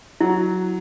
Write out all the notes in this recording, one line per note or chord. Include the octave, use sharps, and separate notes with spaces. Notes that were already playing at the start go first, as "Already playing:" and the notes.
F#3 E4